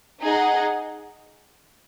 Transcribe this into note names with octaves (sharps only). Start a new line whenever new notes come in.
D#4 G#4 D#5 F#5